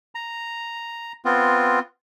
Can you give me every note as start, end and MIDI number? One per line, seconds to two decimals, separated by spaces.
0.15 1.13 82
1.25 1.79 59
1.25 1.79 60
1.25 1.79 65